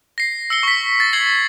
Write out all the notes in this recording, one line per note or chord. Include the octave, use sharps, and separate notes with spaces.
A#6 C7
E6 C#7 G7
C#6 B6
A6
G#6 C7 F#7 G7